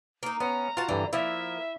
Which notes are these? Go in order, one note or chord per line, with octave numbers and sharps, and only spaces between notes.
A#3 D#4
B3 C#4 A#5
F4 F#4 F5 A5
G2 D3 E3
F3 A#3 E4 E5